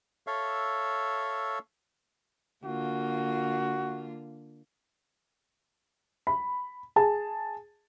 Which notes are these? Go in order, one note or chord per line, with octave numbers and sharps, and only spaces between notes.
A4 C#5 E5 F5
D3 A#3 F4 F#4
B5
G#4 A5